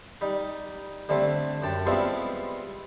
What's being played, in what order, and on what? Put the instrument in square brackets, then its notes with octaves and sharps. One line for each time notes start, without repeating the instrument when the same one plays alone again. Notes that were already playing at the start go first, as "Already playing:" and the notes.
[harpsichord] G3 D#4
D3 G3 A3 C4
F#2 G5 A5
G3 G#3 B3 C4 E4 F4